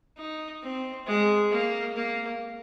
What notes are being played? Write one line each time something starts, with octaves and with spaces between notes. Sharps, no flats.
D#4
C4
G#3
A#3
A#3